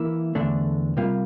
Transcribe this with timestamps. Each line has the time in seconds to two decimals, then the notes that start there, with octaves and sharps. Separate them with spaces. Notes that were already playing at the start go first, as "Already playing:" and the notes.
Already playing: E3 A#3 E4
0.35 E2 D3 A3 D4
0.97 C3 G3 A#3 F4